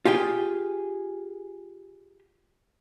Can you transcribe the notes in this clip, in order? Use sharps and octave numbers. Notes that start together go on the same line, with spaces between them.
F4 G4 G#4 G5